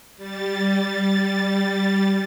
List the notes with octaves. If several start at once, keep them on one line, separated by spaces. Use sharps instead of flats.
G3 A6